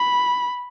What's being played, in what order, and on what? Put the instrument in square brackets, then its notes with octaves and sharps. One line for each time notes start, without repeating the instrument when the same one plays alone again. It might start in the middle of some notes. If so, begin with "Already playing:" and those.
Already playing: [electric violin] B5